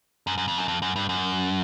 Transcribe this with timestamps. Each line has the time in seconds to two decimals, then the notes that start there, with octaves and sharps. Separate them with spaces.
0.27 F#2
0.38 F#2
0.48 F2
0.58 F#2
0.68 F2
0.82 F#2
0.96 G2
1.09 F#2